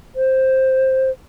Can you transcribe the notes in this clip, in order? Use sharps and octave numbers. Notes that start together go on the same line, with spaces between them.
C5